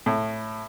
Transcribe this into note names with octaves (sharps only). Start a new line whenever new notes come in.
A2